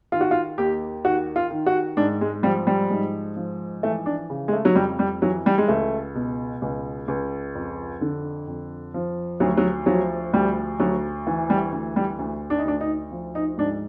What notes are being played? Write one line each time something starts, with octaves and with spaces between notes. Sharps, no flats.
D#3 F4
F#4
F4
D#2 G4
D#3 F#4
F4
D#3
F#4
G#2 D4
G#3
F3 G3
G3
G#2
F3
E3 A3
D4
C#3
G#3
A3
F#3
F2 G3
G3
E3 F#3
G3
G#3
C#2 A3
B2
C#2
C#2
F2
D3
F2
F3
D2 F#3
F#3
F3 F#3
D2 G3
D2 F#3
E3
G3
D2
G3
D2
D4
D#4
D2 D4
D#4
F3
D#4
G#2 D4